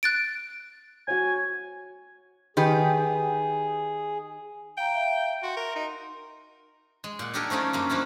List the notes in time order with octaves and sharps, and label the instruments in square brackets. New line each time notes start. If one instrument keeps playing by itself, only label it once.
[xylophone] F#6 A6 D7
[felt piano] F#4 C#5 [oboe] G#5
[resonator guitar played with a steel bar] D#3 G4 B4 [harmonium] G#4
[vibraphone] F5 A#5 [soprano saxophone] G5
[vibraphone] E5 F5
[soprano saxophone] F#4 [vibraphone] C6
[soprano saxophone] A#4
D#4
[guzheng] G#3
A#2 F#5
D4 D#4 G4 A4 A#4 G#5
F3 A3 C#4 D#4 F4
F#2 A#3 F4
F3 A3 D4 E4